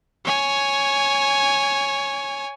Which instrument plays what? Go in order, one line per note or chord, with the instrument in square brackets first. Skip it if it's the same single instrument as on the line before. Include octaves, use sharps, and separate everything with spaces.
[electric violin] C#5 G#5